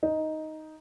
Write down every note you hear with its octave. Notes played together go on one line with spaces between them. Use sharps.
D#4